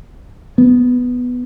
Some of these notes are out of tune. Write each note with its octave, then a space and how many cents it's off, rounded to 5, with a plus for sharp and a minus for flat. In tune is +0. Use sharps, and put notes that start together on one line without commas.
B3 +0